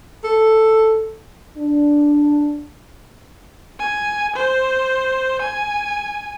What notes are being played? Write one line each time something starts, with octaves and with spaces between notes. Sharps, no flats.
A4
D4
G#5
C5
G#5